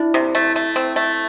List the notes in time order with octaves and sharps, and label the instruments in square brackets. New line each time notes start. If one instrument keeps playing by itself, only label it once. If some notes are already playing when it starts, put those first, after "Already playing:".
Already playing: [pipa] D4 [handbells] E4
[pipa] C3
A3
A3
C4
A3